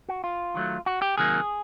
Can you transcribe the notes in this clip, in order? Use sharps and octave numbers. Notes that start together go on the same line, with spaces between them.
F#4
F4
D#3 F#3 A3
F#4
G4
C3 D#3 F#3 A#3 G#4